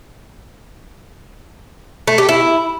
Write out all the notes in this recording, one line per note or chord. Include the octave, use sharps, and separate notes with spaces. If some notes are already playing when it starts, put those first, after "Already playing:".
A3
G4
E4